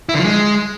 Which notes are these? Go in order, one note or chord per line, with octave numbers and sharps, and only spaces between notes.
E4
D3
F3
G#3